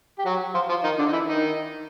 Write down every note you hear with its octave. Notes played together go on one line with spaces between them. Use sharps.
G4
F#3 F#4
F3 F4
F3 F4
D#3 D#4
D3 D4
D#4
E3 E4
D#3 D#4